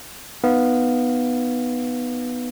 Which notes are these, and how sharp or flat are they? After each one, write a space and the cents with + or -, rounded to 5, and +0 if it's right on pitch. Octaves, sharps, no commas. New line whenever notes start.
B3 +0 D#4 -15 F5 +0